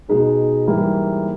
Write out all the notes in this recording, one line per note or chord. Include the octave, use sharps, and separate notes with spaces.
B2 G#3 D#4 G#4
G#2 E3 G3 A#3 E4